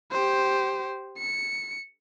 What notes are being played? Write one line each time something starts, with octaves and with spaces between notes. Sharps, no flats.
G4 C5
C#7